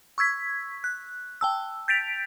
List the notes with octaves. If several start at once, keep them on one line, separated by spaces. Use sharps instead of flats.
C#6 E6 G#6 B6
F#6
G5 A5 E6
G6 A6 B6 D7 F7